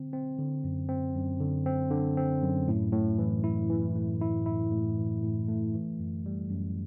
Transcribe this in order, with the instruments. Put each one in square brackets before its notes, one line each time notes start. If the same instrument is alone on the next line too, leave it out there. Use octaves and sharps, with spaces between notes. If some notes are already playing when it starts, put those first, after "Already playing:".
Already playing: [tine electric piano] D3 C4
C4
D3
F#2
C4
F#2
D3
C4
D3
C4
F#2
A2
A2
E3
E4
E3
A3
E4
E4
A2
E3
A2
A3
E3
F#2
G3
F#2